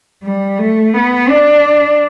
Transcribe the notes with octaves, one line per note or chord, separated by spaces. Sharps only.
G3
A3
B3
D4